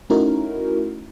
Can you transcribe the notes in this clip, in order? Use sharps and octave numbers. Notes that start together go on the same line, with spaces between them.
A3 C#4 D#4 E4 F#4 A#4